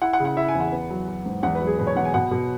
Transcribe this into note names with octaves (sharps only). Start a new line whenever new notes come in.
E4 F#5
F#5
C#3
F#5
E4 E5
G#5
E2
F#5
B3
F#3
F#3
G#2
E2 F#5
B4
F#3
G#4
B2 B4
C#5
E2 F#5
G#5
B2 F#5
B2